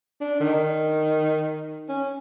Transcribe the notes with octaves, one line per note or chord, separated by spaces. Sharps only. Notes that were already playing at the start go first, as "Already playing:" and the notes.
D4
D#3
C#4